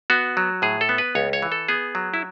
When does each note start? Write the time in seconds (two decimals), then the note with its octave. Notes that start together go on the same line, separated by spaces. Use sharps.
0.10 B3 F#4
0.37 F#3
0.62 A2 G#4
0.81 A4
0.89 B3
0.98 B4
1.15 C#2 C#5
1.33 C#5
1.42 E3
1.52 A4
1.69 B3 G#4
1.95 F#3
2.14 E4